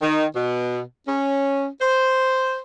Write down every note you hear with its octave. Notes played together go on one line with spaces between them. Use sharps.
D#3
B2
C#4
C5